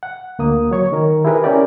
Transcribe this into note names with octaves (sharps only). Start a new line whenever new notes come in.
F#5
D2 A#3 D#6
F#3 C#5 C#6
D#3 A#4
E4 G4 G#4 A#4 B4
C#4 E4 G4 A#4 D5